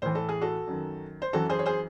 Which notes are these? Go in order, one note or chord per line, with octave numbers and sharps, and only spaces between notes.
A2 E3 C5
A4
G#4
F#4 A4
F#2 D#3
C5
F#2 E3 F#4 A4
G#4 C5
C#5
G#4 C5